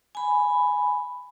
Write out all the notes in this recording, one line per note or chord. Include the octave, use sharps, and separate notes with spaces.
G#5 B5